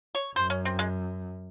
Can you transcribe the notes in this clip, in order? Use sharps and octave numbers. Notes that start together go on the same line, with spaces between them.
C#5
F#2 C5
C#4
C4
G#3